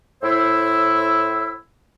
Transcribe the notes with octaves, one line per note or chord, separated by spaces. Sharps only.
A2 E4 C5 E6